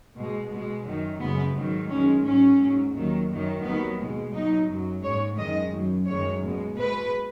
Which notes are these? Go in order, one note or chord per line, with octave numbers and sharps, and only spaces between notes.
B2 G#3
B2 G#3
F#2 D#3 F#3
F#2 C#3 G#3 B3
G#2 D#3 F#3
F#2 D#3 G#3 C#4
G#2 F#3 C#4
G#2 F#3
D#2 D#3 F#3
F#2 D#3 F#3
D#2 D#3 F#3 B3
B2 G#3
B2 F#3 D#4
F#2 F#3
G#2 G#3 C#5
F#2 D#3 G#3 D#5
F#2 F#3
F#2 D#3 G#3 C#5
B2 G#3
B2 G#3 B4